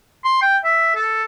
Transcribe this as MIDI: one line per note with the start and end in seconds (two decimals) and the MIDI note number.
0.24 0.41 84
0.41 0.58 79
0.64 0.94 76
0.95 1.23 69